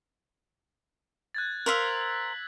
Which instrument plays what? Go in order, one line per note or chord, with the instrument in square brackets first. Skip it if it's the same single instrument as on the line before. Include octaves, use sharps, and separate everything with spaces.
[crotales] F#6 G#6 A6
[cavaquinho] A#4 C5 F5 [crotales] E6 B6 F#7